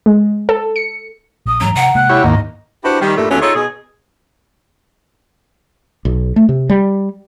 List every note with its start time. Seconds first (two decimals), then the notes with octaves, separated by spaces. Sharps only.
0.06 G#3
0.49 A4
0.76 C#7
1.46 A#1 D#6
1.61 G#2 E3 F#3 C#4 A#5
1.75 C3 F#5
1.95 C3 G#3 A#3 F#6
2.09 E4 G4 C#5
2.24 D#2 G#2 A#3 D#5
2.84 D4 E4 F#4 G4 B4 C5
3.01 D#3 G3
3.17 G2 A#2 G3 A3
3.30 D#2 D3 F#3 A3 B3 C#4
3.41 D#4 F4 G#4 A4 C#5
3.56 B2 G#4
6.05 B1
6.36 A3
6.49 C3
6.70 G3